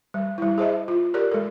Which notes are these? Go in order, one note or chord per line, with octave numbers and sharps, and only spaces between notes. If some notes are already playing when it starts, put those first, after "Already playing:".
G3
G3 E4
G#4 C5 D#5 E5
F4
G4 A#4 C#5 D5
G#3 A4